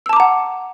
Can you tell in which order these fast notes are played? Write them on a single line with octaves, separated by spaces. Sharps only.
E6 A5 D6 A#5 F#5